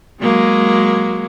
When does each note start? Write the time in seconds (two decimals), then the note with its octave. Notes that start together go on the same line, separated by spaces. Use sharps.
0.21 F#3 G#3 A#3